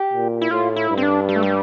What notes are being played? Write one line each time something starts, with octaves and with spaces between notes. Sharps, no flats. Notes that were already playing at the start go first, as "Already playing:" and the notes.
Already playing: G4
A#2
E4
A2 F4
E4
G2
C4
D4
G3
A3
G3